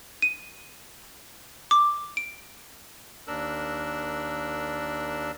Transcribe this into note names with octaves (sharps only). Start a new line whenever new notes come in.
D#7
D6
D7
D#2 D4 A#4 E6 F#6